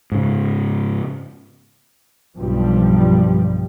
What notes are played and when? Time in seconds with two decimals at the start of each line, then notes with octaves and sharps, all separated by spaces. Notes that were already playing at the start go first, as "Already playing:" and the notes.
0.12 G#2 C#3
2.37 B1 G2 F3 G3